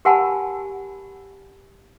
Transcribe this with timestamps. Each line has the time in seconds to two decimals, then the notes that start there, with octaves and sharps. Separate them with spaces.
0.05 G4 A#4 F#5 G#5 A5 B5